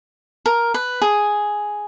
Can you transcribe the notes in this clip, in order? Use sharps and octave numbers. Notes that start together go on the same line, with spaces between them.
A#4
B4
G#4